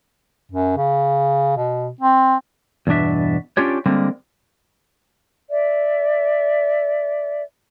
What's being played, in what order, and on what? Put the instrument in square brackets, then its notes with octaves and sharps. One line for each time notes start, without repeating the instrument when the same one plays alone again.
[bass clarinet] F#2
C#3
B2
C4
[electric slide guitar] E2 G2 B2 D4 E5
C#4 D4 F4 G4 C#5
D3 G3 G#3 A#3 C4
[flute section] D5 E5